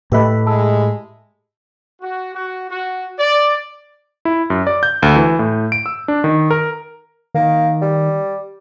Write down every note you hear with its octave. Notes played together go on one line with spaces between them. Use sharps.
A2 A3 G4 B4 D#5 E5 B5 F#6
G#3 A5 E6
F#4
F#4
F#4
D5
E4
F#2
D5
G6
D2
E3
A2
D7
E6
D4
D#3
A#4
D#3 A#3
G3